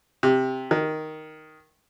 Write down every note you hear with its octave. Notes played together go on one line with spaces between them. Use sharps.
C3
D#3